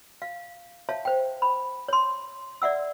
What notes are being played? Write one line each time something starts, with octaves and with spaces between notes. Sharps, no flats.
F5
C#5 E5 F5 A5
C5 G5
B5
C#5 C6
D5 E5 F#5 E6